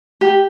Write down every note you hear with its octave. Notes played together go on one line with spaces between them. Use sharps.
G4